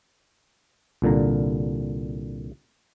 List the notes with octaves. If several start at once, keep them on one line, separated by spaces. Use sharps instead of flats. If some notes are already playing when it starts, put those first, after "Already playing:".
C2 A#2 D3 A#5